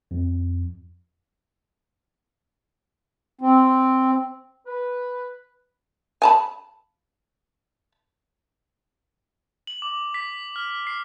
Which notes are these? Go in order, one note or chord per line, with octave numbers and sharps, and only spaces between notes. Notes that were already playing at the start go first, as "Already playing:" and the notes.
F2
C4
B4
G#5 A5 B5
F#7
D6
B6
F6
C7